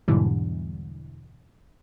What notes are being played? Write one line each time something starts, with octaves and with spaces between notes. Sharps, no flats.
E2 G#2 B2 D3 E3 G3